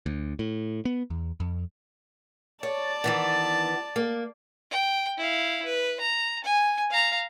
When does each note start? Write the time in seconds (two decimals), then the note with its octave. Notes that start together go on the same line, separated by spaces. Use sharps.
0.06 D2
0.39 A2
0.85 B3
1.10 E2
1.40 F2
2.63 C#5 D5 A5
3.04 D#3 E3 B3
3.96 A#3
4.70 G5
5.18 E4 F5
5.65 B4
6.00 A#5
6.44 G#5
6.90 F5 A#5